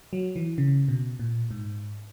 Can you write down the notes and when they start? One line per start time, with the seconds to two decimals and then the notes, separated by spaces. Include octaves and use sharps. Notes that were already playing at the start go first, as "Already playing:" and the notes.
0.13 F#3
0.36 E3
0.58 C#3
0.88 B2
1.20 A#2
1.51 G#2